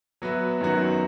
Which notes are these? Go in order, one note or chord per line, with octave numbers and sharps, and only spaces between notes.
F#3 B3 F#4 B4 E5
F#2 D#3 F#3 B3 F#4